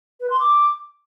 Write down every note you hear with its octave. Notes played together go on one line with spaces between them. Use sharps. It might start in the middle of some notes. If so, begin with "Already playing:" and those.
B4
C6
D6